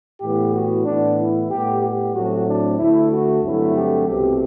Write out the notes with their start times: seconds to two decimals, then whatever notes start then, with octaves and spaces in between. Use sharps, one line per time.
0.21 A2 E3 B3 G4
0.53 F#4
0.85 A2 E3 B3 D4
1.18 E4
1.50 A2 G3 B3 G4
1.82 G4
2.14 A2 F#3 A3 C4 F#4
2.47 D4
2.78 D2 D3 A3 E4
3.10 F#4
3.42 G2 D3 F#3 A3 C4 E4
3.75 G4
4.06 C2 B2 A3 C4 G4